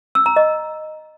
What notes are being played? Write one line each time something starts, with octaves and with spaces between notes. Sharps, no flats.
E6
A#5
D#5